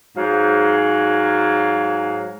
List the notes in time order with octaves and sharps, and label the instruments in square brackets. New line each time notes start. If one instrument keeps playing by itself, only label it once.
[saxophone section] G#2 F#3 F5